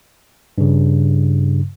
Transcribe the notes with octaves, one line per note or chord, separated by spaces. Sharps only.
G2 C#3